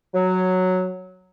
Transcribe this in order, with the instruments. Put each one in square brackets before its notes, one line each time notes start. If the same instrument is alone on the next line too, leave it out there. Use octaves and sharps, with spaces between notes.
[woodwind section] F#3